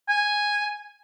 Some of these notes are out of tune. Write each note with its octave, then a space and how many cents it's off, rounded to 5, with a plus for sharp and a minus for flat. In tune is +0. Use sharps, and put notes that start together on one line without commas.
G#5 -5